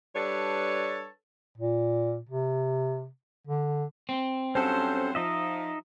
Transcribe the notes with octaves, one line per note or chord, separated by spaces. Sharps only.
G3 D4 A4 B4 C#5
A#2
C3
D3
C4
G2 F#3 C#4 A4 C5
F3 D#4 D#5 E5